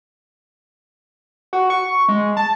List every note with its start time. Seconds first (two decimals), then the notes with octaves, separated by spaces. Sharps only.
1.53 F#4
1.70 C#6
2.08 G#3
2.37 A5